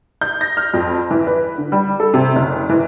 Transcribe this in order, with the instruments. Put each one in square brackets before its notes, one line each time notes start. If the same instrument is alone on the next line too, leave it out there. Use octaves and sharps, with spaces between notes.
[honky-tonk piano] G6
A#6
F6
F2
E3
B4
D3
G3
A4
C3
F#1
E3